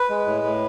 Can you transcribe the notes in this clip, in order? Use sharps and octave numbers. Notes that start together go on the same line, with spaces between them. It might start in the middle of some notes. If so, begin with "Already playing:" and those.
Already playing: B4
G#3
A2
A2